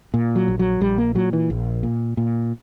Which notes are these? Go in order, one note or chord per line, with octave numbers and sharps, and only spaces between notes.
A#2
F#3
A#1
F#3
A#1 G3
A#3
A#2 F#3
E3
A#1
A#2
A#2